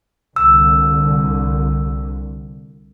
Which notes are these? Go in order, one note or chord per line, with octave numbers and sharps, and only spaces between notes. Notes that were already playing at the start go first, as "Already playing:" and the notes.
C2 D3 E6